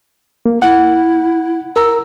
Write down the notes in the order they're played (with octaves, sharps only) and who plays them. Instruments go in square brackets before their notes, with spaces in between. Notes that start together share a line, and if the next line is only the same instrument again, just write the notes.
[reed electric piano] A#3
[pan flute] E4 [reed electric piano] F#5
[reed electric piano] A#4 A#5 [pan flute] E6